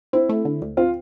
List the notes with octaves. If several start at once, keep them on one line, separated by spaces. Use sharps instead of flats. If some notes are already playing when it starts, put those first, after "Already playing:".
C4 E4
A3
D3
D2
C4 F4